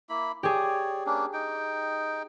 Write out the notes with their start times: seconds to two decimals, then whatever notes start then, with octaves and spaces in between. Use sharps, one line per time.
0.09 A#3 E4 B5
0.43 G4 G#4 C#5 D5
1.06 A#3 C#4 D4
1.33 D#4 G5